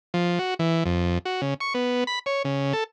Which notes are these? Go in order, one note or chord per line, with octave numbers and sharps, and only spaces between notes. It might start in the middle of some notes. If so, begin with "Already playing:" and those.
F3
F#4
E3
F2
F#4
C#3
C#6
B3
B5
C#5
C#3
A4